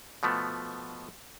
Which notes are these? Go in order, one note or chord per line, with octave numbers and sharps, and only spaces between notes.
B2 F3 A3 B3